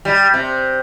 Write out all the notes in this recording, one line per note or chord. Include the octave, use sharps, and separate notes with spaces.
G3
C3